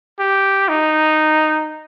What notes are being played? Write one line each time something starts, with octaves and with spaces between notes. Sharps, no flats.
G4
D#4